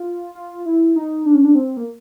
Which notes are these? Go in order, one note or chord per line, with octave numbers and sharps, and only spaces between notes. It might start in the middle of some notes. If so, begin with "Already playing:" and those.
Already playing: F4
F4
E4
D#4
D4
C#4
D4
C4
A#3